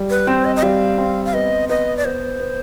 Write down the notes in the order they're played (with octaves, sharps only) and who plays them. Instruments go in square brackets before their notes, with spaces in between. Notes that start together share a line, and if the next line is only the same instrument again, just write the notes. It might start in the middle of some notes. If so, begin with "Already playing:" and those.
Already playing: [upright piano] G3
[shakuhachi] B4
[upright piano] C4 [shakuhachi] C5
[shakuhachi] D#5
D#5
[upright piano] G3 [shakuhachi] F5
[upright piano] C4
[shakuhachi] F5
[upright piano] B3 [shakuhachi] D#5
[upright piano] B3 [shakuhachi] D#5
[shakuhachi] D5
[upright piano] B3 [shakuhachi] C5
[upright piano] B3